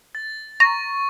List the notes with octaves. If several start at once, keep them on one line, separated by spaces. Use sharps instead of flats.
A6
A#5 C#6